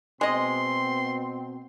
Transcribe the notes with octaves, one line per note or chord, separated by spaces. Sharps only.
B2 G#3 C4 D#5 C6